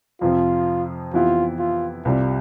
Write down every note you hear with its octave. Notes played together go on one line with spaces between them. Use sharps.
F2 C3 F3 F4
F2 E3 B3 E4 F4 G4
F4
C2 C3 G3 F4